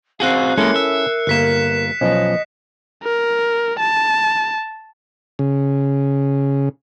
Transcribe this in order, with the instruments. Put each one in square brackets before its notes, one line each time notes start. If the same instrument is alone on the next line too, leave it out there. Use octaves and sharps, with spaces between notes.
[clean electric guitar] C4 F#4 G#4 [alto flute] F5 [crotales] F#6 C7
[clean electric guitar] G#3 A#3 [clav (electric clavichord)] C#4 E4 A4 [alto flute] A#4 [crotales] C#7
[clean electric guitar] E5
[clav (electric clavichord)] G1 A#3 [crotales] F#6 B6 E7
[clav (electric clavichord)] B1 F3 C#4 [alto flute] D#5
[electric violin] A#4
A5
[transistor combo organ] C#3